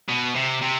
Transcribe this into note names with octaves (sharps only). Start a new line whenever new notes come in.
B2
C3
C3